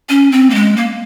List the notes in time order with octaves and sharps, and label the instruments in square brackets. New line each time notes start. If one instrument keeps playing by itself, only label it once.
[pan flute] C#4
C4
A#3
G#3
A#3